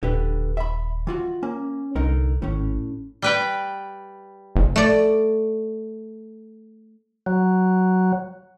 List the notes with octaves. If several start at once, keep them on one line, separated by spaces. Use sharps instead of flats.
D#1 D3 G4 B4
E5 B5
E3 F4 F#4
A#3 C#4
C2 D3 D#4 A#4
G#1 A2 C#4
G3 B4 G5
F#1
A3 D5
F#3